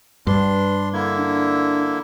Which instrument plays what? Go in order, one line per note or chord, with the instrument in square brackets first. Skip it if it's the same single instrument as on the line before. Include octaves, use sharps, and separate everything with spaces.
[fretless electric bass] G2 [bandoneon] D4 C6 [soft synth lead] B4
[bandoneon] D3 A#3 E4 [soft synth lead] G#6
[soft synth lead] D4